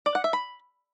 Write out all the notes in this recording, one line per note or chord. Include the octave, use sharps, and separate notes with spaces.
D5
F#5
E5
B5